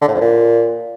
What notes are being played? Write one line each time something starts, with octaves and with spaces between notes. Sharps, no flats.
D3
A2
F2
A#2